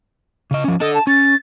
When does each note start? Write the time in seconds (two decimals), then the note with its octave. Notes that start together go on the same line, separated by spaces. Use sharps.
0.51 C#3 D#5
0.64 F3 C#4
0.80 D4 A4 D#5
0.94 A5
1.07 C#4 A6